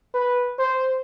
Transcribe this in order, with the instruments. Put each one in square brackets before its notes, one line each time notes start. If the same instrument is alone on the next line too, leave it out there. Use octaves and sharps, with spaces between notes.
[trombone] B4
C5